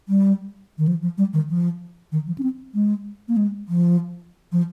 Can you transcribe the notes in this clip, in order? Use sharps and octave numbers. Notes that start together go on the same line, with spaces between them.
G3
D#3
F3
F3
G3
D#3
F3
D#3
F3
C#4
C4
G#3
A#3
G#3
F3
F3